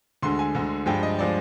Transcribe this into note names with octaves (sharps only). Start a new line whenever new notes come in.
D2 D3 G#3 C6
G#5
D2 D3 G#3
G2 F3 G#3 G5
D#5
F3 G#3 D5